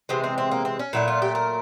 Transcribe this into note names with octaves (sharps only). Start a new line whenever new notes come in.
C3 E3 G#3 C4
C4
C4
A#3
C4
C#4
A#2 F#3 A3 E4
F4
G4
A#4